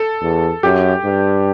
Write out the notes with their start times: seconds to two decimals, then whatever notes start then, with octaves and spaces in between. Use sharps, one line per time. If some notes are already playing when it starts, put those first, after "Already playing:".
Already playing: A4
0.22 E2
0.63 F#2 G4
1.05 G2